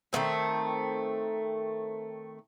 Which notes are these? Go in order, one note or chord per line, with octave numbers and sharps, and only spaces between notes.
D#3 A3 A#3 C4